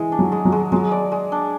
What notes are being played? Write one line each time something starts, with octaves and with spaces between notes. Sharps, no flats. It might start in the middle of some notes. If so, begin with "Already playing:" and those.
Already playing: E3 G#3 G#4
D4
F#3
G#3
F#3
G#3
F#3 G#3
D5
G#3
D4